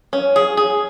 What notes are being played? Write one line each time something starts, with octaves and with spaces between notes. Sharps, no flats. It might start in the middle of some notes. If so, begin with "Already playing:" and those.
C#4
G#4
G#4